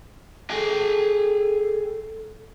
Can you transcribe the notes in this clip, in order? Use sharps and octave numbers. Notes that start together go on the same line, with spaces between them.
G#4 A4 G5